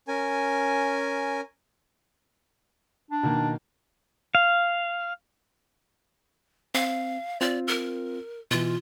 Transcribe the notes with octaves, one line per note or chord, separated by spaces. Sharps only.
C#4 A#4 G#5
D4
B2 D#3 A#3
F5
C4 F5
C4 F4 D5
A#4
B2 E3 F4